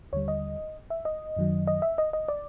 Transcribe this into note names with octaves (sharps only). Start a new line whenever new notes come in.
D#2 D3 G3 C#5
D#5
E5
D#5
F#2 D#3 F#3
D#5
E5
D#5
D#5
D5